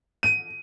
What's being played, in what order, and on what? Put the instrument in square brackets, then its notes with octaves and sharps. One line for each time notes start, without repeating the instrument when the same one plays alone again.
[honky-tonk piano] D#7